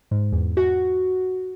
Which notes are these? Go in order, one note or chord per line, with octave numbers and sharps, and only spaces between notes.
G#2
E2
F#4